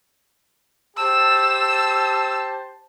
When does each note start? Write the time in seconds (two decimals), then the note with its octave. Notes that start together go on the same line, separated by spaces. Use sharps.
0.97 G4 C5 A5 E6